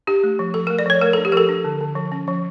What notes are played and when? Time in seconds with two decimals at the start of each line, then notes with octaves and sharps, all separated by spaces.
0.07 D4 G4
0.24 A3
0.39 F3
0.54 F3 A4
0.67 A3 A#4
0.79 D5
0.86 F3 C#5
1.01 A3 A#4
1.13 D4 A4
1.25 G4
1.32 F3 A4 A#4
1.49 D4
1.65 D3
1.81 D3
1.95 F3
2.12 C#4
2.28 F3